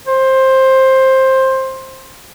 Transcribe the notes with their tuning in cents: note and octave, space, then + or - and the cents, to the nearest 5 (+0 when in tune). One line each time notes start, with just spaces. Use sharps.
C5 +15